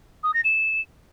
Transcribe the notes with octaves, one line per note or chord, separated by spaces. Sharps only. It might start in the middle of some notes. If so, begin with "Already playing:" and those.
D#6
A#6
E7